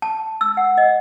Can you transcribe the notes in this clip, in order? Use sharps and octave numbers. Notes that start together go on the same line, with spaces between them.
A5
E6
F#5
D#5